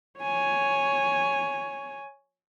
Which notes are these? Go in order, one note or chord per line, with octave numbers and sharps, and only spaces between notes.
C#5 G#5